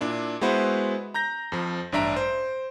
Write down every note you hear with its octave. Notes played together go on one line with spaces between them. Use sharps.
A#2 D4 E4
G#3 B3 E4 F#4 B4 C5
A#5 G6 A#6
F2 F3
A1 G2 D4 E5 A#5 D7
C5